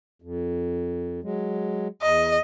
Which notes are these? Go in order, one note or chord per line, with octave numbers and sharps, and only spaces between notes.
F2
F#3 G#3
E2 D#5